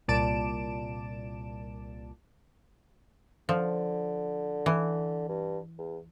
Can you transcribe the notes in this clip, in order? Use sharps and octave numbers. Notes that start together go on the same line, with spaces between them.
C2 A#2 D5 A5 D7 E7
D3 F3
E3
G2
E2